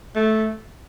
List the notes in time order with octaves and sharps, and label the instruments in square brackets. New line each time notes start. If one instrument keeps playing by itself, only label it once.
[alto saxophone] A3